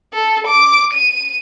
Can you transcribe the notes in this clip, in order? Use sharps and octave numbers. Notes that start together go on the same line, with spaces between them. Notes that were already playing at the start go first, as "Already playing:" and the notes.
A4
D6
D#7